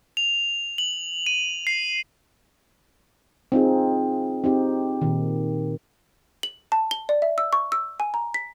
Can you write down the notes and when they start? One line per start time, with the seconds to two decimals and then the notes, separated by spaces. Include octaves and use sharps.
0.17 F7
0.78 F#7
1.26 D#7
1.67 C7
3.52 C4 D#4 F4 G#4
4.44 C4 D#4 G4
5.02 A#2 D#3
6.43 F#7
6.72 A5
6.91 G7
7.09 D5
7.22 E5
7.38 E6
7.53 C#6
7.72 E6
8.00 G#5
8.14 A#5
8.34 B6